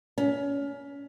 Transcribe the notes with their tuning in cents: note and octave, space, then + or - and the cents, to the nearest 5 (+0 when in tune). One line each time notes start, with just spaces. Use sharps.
C#4 +25